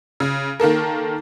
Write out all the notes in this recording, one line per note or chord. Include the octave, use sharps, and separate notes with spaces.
C#3
D#3 A#3 A4 A#4